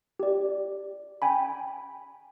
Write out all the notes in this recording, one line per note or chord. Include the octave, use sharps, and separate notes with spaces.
G4 D5
G5 G#5 B5